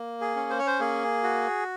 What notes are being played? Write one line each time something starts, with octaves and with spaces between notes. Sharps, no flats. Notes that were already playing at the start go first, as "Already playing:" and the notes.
Already playing: A#3
G#4
C#4
C5
C#5
C5
A#3 G#4
F#4